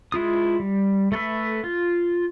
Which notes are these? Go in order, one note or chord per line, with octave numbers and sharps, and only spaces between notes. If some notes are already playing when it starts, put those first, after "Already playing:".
G#3 E4 F4 D#6
G3
A3 A4 B4 E5
F4